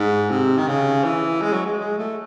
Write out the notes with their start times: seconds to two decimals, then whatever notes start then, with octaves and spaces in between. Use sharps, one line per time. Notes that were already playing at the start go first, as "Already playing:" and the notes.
Already playing: G#2
0.30 C3
0.58 D#3
0.68 C#3
1.04 E3
1.42 G#3
1.53 F#3
1.66 G#3
1.79 G#3
1.97 A3